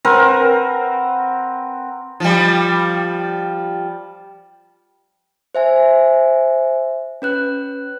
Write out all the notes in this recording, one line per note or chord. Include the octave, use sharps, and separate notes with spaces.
C4 A#4 B4 F#5
F3 G3
C5 E5 G#5
C#4 B4 F#6